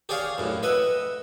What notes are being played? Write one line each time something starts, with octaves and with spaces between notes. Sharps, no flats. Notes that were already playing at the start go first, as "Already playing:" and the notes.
G4 G#4 C#5 D5 F5
F#2 A2
B4 D#5 E5 F#5